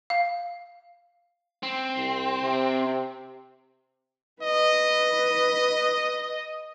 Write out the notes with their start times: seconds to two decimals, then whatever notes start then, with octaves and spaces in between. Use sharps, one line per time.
0.10 F5
1.63 C4
1.96 C2
2.42 C3
4.42 B4 D#5